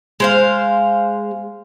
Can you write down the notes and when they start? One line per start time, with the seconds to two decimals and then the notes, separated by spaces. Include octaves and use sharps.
0.20 G#3 C5 F5